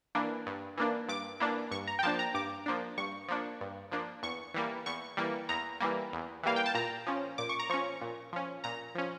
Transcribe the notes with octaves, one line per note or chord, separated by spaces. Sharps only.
E3 A#3 D4
G2
E3 A#3 D4
G2 D6
E3 A#3 D4
G2 C#6
A#5
G5
F3 A#3 D4 A5
A#5
G2 D6
F3 A#3 D4
G2 C#6
F3 A#3 D4
G2
F3 A#3 D4
E2 C#6
E3 G3 A#3
E2 C#6
E3 G3 A#3
E2 A#5
E3 G3 A#3
E2
E3 G3 A#3 F5
G5
A5
A#2 A#5
F3 C#4
A#2 D6
C#6
A#5
F3 C#4 C#6
A#2
F3 C#4
A#2 A#5
F3 C#4